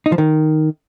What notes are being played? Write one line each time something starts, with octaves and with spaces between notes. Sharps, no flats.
D#4
F3
D#3